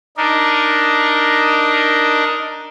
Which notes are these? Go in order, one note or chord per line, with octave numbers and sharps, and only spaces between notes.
D4 D#4 A#4